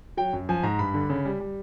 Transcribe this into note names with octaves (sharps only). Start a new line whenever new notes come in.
F#3 G5
F#2
F3 G#5
G#2 A#5
G2 B5
D3
C#3
G3
G3